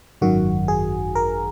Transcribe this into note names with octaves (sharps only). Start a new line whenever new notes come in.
G#1 F#2 D#3 F#4
G#4
A#4